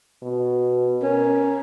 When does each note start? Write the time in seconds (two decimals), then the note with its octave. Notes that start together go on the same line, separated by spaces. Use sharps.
0.23 B2
1.03 C#4 A#4